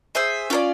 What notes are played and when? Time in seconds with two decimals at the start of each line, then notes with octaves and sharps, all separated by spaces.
0.15 G#4 C5 E5 G#5
0.50 C#4 F4 A#4 D5